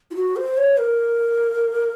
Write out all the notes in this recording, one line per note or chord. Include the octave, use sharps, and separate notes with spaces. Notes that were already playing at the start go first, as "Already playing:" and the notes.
F4
F#4
C5
C#5
A#4